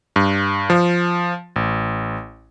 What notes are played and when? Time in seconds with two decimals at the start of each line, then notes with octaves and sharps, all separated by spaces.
0.16 G2
0.70 F3
1.56 A1